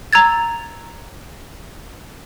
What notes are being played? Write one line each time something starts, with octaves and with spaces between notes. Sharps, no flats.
A#5 E6 G#6 A6